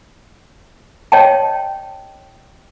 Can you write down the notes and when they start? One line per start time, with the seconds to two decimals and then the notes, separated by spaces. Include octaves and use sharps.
1.12 C#5 D#5 G5 A5